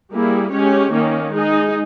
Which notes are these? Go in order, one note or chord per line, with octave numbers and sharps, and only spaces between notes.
G3 A#3 E4 G#4
G#3 C#4 G4 C#5
D#3 A#3 C#4
G#3 D#4 G#4